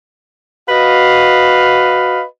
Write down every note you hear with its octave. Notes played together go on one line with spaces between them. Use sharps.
F#4 B4 D#5 F5